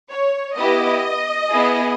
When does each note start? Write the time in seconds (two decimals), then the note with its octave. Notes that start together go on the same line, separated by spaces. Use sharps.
0.09 C#5
0.56 B3 E4 G4 D#5
1.49 B3 E4 G#4